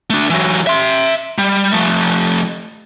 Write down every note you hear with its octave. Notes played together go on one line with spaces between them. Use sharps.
A3 D4
E3 F#3
E5 C6
G3
F3 A3